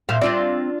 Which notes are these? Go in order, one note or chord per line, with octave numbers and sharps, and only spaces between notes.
A#2 E4 C5 F5
C4 D4 F4 D5